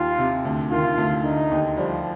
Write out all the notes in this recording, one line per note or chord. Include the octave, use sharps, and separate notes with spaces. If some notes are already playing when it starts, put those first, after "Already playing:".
Already playing: D#2 F4
C3
D2
D#3 F4
D2
D3 D#4
D#2
F3 G3